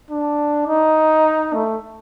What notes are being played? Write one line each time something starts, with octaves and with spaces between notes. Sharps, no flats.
D4
D#4
A3